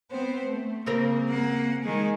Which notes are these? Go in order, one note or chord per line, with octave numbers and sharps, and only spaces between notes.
B3 C4 C5
A3
C#3 A#3 C4 A#4
A#3 F#5
D#3 G#3 G#4 G#5